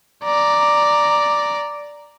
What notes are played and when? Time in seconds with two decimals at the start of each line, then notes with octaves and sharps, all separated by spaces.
0.25 D5 A#5